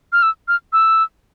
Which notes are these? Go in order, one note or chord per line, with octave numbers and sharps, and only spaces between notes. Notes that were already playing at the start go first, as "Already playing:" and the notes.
F6
E6
F6
E6